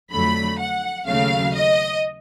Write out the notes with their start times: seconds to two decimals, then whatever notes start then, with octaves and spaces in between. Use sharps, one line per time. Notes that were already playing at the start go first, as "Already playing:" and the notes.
0.12 F2 D3 F#3 A3 B5
0.59 F#5
1.07 D#2 C#3 F#3 A3 F5
1.54 D#5